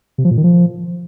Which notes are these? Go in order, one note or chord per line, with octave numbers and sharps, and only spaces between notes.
C3
F3
A#2
D#3
F3